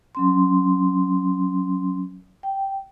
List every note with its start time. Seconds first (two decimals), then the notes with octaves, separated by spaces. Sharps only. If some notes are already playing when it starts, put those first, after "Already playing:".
0.15 F#3 C#4 C6
2.43 G5